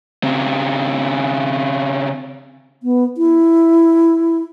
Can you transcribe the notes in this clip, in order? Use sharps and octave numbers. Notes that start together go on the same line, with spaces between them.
C#3 C4
B3
E4